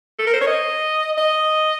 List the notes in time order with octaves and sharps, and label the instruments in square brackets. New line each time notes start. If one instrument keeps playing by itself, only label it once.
[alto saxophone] A4
A#4
C5
C#5
D#5
D#5